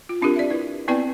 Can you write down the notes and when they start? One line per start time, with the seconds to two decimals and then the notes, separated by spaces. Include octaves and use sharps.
0.09 F4
0.22 C4 D4 F4 G4 A#4
0.36 D5 E5
0.50 E4 B4
0.88 B3 C4 E4 B4 D5 G5